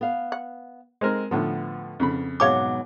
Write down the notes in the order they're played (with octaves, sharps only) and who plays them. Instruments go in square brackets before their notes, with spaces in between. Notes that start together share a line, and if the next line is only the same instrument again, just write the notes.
[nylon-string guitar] B3 F5
[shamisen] F#5
[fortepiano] G#3 C4 A#4
[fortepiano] A2 D3 F3 [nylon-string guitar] B3
[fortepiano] F2 C#3 B5
[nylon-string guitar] G#2 B2 F#3 [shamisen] G#4 C#5 F5 [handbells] D6